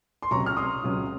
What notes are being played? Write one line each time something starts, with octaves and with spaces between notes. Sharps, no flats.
C6
C#2 C3 F#3 C#4 F4 A#5 C#6
F6
C6 D#6
C#2 C3 F#3 C#4 F4